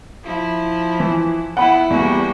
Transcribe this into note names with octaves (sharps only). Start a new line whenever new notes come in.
F3 E4
E3
B3 E4 F#5 B5
E2 G3 A#3 F#4